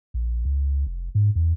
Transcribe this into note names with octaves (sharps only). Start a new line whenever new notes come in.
A#1
C#2
F1
G#2
E2